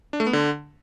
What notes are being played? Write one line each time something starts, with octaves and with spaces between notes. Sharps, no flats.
D4
A3
B3
D3